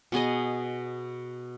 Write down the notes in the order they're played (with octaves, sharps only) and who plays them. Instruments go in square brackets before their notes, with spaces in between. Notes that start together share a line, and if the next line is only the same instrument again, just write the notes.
[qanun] B2 B3 G#4 D#5